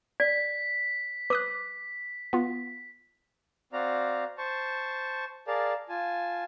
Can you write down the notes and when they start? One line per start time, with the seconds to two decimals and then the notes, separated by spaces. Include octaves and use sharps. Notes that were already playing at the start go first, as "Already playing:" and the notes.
0.20 D5 B6
1.30 B4 D6 D#6 F#6
2.33 B3 F4
3.73 C4 F#4 D5 F5 A#5
4.38 C5 A5 C#6
5.47 G#4 A#4 D5 F5 A5
5.89 F4 G#5 A5